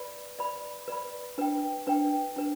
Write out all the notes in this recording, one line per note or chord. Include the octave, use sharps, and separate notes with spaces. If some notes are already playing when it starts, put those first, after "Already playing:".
Already playing: B4 D5 B5
B4 D5 B5
B4 D5 B5
D4 B4 G5
D4 B4 G5
D4 B4